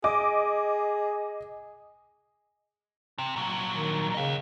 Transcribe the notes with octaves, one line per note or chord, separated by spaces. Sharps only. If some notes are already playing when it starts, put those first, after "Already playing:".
G#4 D#5 D6
C3
A#2 F#3
D#3
C#3 D#5 F5